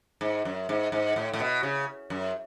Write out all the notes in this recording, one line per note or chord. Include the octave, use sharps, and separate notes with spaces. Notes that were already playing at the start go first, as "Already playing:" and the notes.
G#2
F#2
G#2
G#2
A2
A2
B2
C#3
F#2